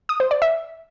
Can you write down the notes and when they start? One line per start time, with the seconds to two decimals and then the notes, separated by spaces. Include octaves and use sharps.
0.09 D#6
0.20 C5
0.31 D5
0.42 E5